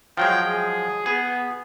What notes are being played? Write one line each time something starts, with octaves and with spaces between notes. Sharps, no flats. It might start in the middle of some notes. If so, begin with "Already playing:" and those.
F3 F#3 G#3 G5
G#4
B3 G#4